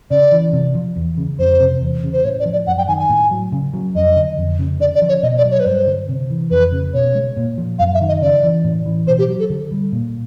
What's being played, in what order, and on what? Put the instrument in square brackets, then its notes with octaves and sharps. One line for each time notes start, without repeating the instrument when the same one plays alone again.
[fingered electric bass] C#3 [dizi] D5
[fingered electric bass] E3
C3
F3
E2
C#3
[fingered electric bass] F2 [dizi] C5
[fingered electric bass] C3
E2
C#3
[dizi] C5
[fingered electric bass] A2 [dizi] C#5
[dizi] D5
[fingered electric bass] F3
[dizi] D5
[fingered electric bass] F#2 [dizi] F#5
[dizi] G5
[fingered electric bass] D#3 [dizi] G#5
[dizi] G#5
[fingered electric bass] A2
F#3
C#3
F#3
[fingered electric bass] F2 [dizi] D#5
[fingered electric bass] D3
F2
C#3
[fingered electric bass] D3 [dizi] D5
[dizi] D5
[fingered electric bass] F3
[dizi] C#5
[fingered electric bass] B2 [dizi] D#5
[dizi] D5
[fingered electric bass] F#3
[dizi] C#5
B4
[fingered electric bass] G2 [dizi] C5
[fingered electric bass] D3
C3
E3
[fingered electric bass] F2 [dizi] B4
[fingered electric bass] C#3
[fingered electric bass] B2 [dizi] C#5
[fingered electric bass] G#3
A#2
F3
[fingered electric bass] F#2 [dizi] F5
[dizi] E5
[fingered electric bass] D#3
[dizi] D#5
[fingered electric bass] C#3 [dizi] D5
[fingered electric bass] E3
A2
E3
[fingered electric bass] B2 [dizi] C5
[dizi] G4
[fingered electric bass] F#3
[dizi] A4
[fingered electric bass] D3
G3
A#2